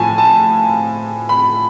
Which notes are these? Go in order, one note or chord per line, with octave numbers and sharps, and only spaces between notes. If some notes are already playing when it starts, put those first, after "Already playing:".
Already playing: A2 F3 G#5 A5
A5
B5